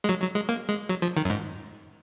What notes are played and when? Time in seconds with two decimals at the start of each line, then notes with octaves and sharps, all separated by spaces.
0.04 G#3
0.09 F#3
0.22 F#3
0.35 G#3
0.49 A#3
0.69 G#3
0.89 F#3
1.02 F3
1.17 D#3
1.25 F#2
1.30 G#2